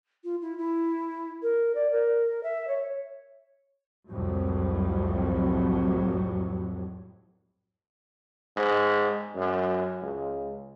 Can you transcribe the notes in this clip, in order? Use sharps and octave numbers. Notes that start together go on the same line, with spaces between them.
F4
E4
E4
A#4
D5
A#4
E5
C#5
C2 F2 A2 F#3 G3
G#2
F#2
C#2